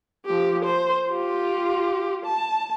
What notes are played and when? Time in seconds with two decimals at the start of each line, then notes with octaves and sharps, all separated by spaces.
0.26 F3 G4
0.65 C5
1.10 F4 G4
2.25 A5